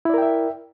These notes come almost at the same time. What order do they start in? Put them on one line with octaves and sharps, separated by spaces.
E4 D5 A#4 G5 E5